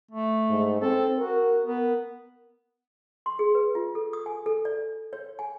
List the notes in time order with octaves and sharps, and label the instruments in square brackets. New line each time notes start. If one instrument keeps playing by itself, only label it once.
[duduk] A3
[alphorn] G#2
[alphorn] C4 [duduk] A4
[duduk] F#4 [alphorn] A#4
[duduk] B3 [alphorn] A#4
[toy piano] C6
G#4
B4
F4
A4
D#6
G#5
A4
D5
C#5
G#5